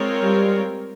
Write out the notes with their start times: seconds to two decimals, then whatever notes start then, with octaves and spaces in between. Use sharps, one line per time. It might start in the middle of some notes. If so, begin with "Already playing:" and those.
Already playing: G#3 C4 F4 A#4 C#5
0.22 G3